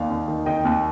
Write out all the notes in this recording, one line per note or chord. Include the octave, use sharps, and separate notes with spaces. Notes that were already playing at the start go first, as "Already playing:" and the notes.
Already playing: D#2 D#3 D5 F5
D#2
D#3
D#3 D#5 G5
D#2